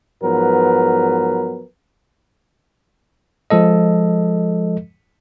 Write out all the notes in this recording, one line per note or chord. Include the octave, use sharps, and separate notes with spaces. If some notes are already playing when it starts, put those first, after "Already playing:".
G#2 F3 F#3 B3 A#4 B4
F3 G#3 A4 D#5